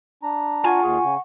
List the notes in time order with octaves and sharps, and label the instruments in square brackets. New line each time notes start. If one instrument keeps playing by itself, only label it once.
[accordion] D4 A#5
[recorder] F4 [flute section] F#5 C#6 [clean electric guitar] G#5
[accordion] D#2 G#4
C#3